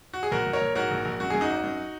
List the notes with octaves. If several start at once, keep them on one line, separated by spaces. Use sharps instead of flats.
F#4
G#4
A#1 F#4 A#4
A#1
A#4 C#5
A#1
G#2 F#4 A#4
A#1
A#1
F#2 F#4
F#2 G#4
D#4 F#4
G#1
F#2